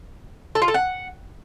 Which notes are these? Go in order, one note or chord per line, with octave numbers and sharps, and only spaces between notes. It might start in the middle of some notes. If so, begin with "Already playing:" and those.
A4
F4
A4
F#5